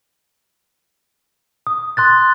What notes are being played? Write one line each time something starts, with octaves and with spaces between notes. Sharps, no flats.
D#6
C6 F#6 A6